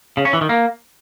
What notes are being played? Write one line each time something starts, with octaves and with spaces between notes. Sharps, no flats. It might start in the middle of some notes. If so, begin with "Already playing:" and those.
C#3
C#4
E3
D#3
A#3